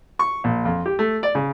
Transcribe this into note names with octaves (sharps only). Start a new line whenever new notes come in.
C#6
A#1
F2
G4
A3
D5
C#3